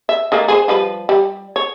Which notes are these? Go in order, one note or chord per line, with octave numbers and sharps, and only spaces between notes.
E5
D#3 A3 A#3
G#4 B4 C5
F3 G3 B4
G3
C#5